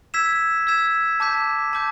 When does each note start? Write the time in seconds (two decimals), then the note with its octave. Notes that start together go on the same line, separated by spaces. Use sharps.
0.14 E6 G#6 B6 E7
0.67 E6 G#6 B6 E7
1.20 A5 D6 G6 B6
1.73 A5 D6 G6